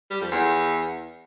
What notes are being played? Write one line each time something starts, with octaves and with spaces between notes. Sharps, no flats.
G3
F2
E2